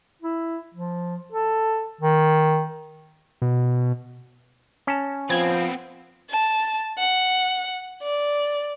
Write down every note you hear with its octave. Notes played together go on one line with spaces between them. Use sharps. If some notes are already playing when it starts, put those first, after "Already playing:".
E4
F3
A4
D#3
B2
C#4 A5
F3 B3 C4 G#6
A5
F#5
D5